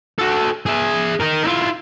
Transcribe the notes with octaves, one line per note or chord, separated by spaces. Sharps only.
F#4 A4
G#4 E5
D#4 A#4
E4 F4